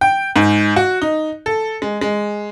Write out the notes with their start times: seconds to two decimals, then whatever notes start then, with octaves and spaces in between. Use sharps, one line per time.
0.01 G5
0.36 G#2
0.76 F#4
1.02 D#4
1.46 A4
1.82 G#3
2.01 G#3